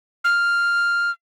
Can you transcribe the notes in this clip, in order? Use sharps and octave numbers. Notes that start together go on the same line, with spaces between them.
F6